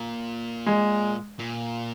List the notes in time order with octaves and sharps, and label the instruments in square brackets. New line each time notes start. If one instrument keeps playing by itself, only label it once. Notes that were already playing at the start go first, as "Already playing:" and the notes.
Already playing: [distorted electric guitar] A#2
[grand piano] G#3
[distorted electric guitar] A#2